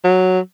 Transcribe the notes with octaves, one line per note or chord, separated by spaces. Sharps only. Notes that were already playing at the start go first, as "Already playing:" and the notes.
F#3